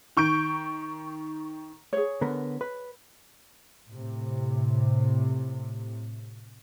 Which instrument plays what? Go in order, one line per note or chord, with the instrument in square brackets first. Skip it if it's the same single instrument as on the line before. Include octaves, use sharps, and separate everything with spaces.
[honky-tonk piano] D#3 C#6 G6 D7
[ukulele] G#4 C#5
[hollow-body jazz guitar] D3 B3 A#4
B4
[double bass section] A2 C3